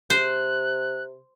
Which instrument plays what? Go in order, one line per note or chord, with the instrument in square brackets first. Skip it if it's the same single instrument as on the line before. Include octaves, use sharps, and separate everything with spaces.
[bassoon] C3 [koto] C5 [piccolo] F#6